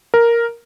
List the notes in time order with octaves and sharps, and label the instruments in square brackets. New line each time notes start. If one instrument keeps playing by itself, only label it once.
[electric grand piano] A#4